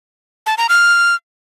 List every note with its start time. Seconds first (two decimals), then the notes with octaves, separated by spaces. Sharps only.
0.46 A5
0.58 A#5
0.69 F6